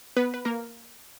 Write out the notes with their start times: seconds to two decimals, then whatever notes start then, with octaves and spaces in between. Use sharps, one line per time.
0.17 B3 B4
0.34 B4
0.45 A#3 A#4